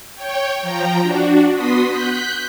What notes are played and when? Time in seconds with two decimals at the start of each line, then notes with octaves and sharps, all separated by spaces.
0.15 C#5 G5
0.62 F3 G5 A#5
1.02 D4 F#4
1.54 B3 F#4 C6 D#6 B6
1.88 F#6 G6 B6